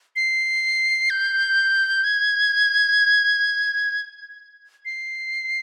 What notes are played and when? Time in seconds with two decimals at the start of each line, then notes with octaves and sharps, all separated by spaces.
0.16 C7
1.10 G6
2.04 G#6
4.85 C7